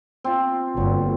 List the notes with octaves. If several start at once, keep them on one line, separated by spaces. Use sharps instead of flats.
C4 F4
G1 A#2 F#3